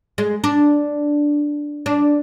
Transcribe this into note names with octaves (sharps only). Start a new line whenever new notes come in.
G#3
D4
D4